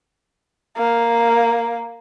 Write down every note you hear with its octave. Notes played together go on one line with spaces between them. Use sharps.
A#3